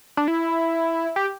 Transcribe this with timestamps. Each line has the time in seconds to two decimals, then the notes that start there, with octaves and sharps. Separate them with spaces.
0.17 D4
0.28 E4
1.16 G4